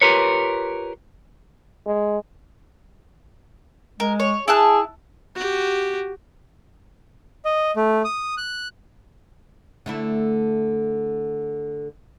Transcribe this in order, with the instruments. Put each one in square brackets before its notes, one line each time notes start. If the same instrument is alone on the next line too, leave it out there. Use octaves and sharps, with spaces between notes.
[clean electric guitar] F4 G4 A#4 B4 C#5
[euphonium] G#3
[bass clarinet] G#3 [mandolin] A#4
[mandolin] C#5
[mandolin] E4 A5 F#6 [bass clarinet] G#4
[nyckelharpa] F#4 G4
[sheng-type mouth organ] D#5
A3
D#6
F#6
[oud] D3 A3 E4